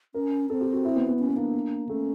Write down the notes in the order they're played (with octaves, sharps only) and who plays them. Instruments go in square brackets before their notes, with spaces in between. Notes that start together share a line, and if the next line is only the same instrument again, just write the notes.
[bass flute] C#4 [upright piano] A#4
[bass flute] C4 [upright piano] A4
[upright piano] G4
F#4
E4
B3
B3
[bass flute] C#4
[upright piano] B3
[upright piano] A#3 [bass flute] D4
[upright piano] A3 [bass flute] C#4